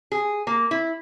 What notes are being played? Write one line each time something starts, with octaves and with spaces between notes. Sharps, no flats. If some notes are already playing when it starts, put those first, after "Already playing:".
G#4
A#3
E4